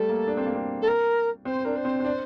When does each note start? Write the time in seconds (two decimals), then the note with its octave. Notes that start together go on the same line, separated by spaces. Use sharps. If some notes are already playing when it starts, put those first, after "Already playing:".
Already playing: G3 A3 A4
0.09 A#3
0.27 D4
0.37 C4
0.46 A#3
0.55 C4
0.81 A4
0.87 A#4
1.45 C4 C5
1.64 D4 A#4
1.75 C5
1.85 C4
2.00 C4
2.05 D4